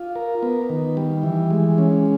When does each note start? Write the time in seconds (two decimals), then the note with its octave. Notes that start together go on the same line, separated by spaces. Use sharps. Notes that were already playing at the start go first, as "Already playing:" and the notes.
Already playing: F4
0.15 A#4
0.43 B3
0.69 D#3
0.97 G3
1.23 E3
1.51 G#3
1.78 C#4